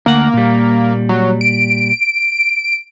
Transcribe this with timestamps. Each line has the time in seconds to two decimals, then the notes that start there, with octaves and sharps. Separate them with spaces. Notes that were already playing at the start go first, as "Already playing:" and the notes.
0.06 D2 A#3 F#5
0.34 A#2 G3
1.09 F#3
1.41 D7